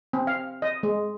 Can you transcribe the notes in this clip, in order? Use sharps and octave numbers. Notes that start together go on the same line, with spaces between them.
C4
F5
D#5
G#3